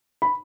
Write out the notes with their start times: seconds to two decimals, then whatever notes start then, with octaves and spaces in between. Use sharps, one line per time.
0.22 B5